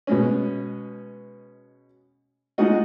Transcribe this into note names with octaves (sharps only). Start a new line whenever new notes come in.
B2 G#3 C#4
G#3 D#4 F4 F#4 D#5